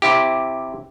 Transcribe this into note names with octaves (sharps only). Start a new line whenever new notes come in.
C3 E4 G4